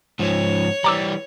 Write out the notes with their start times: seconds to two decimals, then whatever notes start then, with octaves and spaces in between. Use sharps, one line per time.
0.19 G#2 F3 C#5
0.84 E3 G3 A#5 D6 E6